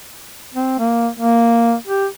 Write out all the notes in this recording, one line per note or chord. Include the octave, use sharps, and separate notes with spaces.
C4
A#3
A#3
G4